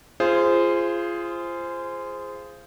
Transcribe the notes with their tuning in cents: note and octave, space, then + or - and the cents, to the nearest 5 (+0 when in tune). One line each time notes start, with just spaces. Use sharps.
F4 -25 G#4 +0 C5 +0